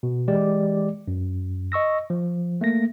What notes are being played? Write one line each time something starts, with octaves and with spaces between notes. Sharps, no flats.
B2
E3 G#3 G4 D5
F#2
D#5 C#6 E6 A#6
F3
A3 A#3 A#6